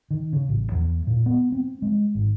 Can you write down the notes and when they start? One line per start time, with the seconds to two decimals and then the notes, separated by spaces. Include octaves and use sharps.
0.11 D#3
0.33 C#3
0.49 A1
0.72 E2
1.07 A#2
1.26 B3
1.52 C4
1.82 G#3
2.15 G#1